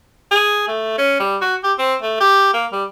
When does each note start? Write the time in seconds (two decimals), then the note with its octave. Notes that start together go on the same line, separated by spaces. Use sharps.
0.31 G#4
0.68 A3
0.98 C#4
1.20 G3
1.41 F#4
1.64 G4
1.79 C4
2.02 A3
2.21 G4
2.54 A#3
2.72 G3